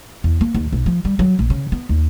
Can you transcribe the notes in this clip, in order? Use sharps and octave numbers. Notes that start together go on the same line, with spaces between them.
E2
A#3
D#2
B1
F3
G3
F#3
A#1
C#3
B3
D#2